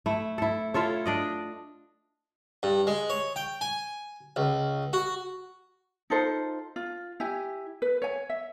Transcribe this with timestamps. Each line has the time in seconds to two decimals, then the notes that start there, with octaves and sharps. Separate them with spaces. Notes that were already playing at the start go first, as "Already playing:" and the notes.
0.06 A3 E4
0.38 E4 A4
0.74 E4 F4 A4 C#5
1.05 D4 D5 D#5
2.63 G2
2.87 G#3
3.10 C#5
3.36 G5
3.61 G#5
4.36 C#2
4.93 F#4
6.10 D#4 F4 A4 C5
6.76 F4
7.20 E4 G4 G#5
7.82 B4
8.02 C#5 G#5
8.30 E5